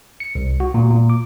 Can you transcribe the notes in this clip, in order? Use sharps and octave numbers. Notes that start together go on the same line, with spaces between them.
C#7
C2
F#4
A#2
A#2
D6